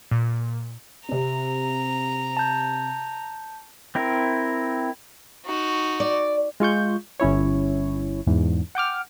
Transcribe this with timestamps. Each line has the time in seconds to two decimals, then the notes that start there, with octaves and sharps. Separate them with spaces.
0.11 A#2
1.09 C3 C4 A#5
2.37 A5 G6
3.95 C4 E4 A#4
5.45 D#4 F#4
6.00 D5
6.60 G#3 F4 C#6 G6
7.20 G1 C#4 E4 C#5
8.27 E2 G#2
8.75 F#5 G5 D6 F6